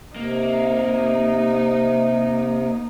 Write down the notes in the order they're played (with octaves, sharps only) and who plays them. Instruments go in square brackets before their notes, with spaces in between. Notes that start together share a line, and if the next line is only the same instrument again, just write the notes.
[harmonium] C3 [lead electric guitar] A#3 [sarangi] D#4